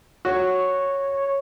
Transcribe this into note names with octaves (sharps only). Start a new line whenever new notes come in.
F#4 C#5